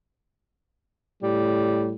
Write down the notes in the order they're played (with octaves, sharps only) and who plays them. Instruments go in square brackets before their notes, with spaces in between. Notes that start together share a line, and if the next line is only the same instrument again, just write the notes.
[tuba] A2 [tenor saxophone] G3